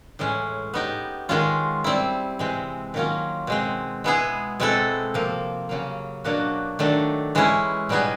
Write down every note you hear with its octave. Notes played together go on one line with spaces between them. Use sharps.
A2 E3 G#3 C#4
B3 D#4 G4
D#3 G#3 C#4 F4
G3 C4 E4
C3 E3 G#3 C4
D#3 F#3 A#3 C#4 F4
B2 G#3 C4
G#3 B3 E4 G#4
B2 G#3 C4 E4 A4
C3 F3 A#3
C#3 F#3 A#3
B2 F#3 A#3 D4 F#4
D#3 F#3 A3 D4
E3 G#3 C#4 E4
B2 G3 B3 D#4 G#4